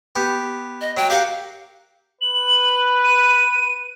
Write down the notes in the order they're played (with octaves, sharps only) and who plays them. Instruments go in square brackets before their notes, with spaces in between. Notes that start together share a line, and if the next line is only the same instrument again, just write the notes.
[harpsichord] B3 G4
[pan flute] D#5
[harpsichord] F#3 [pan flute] G5
[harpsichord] G4 A#4 F#5 [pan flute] F5
[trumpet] B4 [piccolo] F#7
[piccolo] D#7